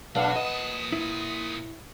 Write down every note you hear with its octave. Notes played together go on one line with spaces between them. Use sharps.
B1 F#3 D4 B4 F5 F#5
A#2 D#5 A5 D#6
E4